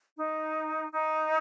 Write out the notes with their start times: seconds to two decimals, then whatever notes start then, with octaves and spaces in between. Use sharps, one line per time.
0.17 D#4
0.91 D#4